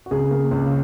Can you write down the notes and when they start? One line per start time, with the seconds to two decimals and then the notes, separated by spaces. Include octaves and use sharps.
0.06 F#4
0.11 C#2 G#4
0.31 A#3
0.51 C#2